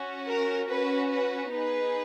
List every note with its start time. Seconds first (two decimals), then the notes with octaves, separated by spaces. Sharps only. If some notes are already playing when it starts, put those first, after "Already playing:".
Already playing: C#4 F#4
0.27 A#4
0.68 C#4 F#4 B4
1.09 B4
1.50 B3 D#4 G#4 B4